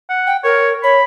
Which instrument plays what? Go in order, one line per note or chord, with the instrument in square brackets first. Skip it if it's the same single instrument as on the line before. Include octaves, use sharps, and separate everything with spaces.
[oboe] F#5
[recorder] G5
[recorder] A#4 [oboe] C#5
[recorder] C#5 [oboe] B5